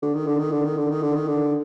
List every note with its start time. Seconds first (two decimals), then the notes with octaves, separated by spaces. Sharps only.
0.02 D3
0.15 D#3
0.27 D3
0.39 D#3
0.52 D3
0.65 D#3
0.78 D3
0.90 D#3
1.03 D3
1.15 D#3
1.28 D3